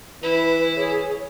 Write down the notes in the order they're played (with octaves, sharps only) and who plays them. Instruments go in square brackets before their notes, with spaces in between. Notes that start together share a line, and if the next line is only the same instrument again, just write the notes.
[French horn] E3 [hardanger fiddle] E4 [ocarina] B4
[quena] G#4 [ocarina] C#5